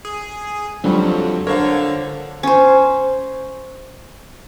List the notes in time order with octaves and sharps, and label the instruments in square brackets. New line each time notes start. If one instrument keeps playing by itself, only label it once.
[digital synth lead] G#4
[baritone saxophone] F2 [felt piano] D3 G3 [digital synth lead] F#3
[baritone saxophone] D3 [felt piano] A#4 C5 F5 [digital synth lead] C#5
[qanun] C#4 C5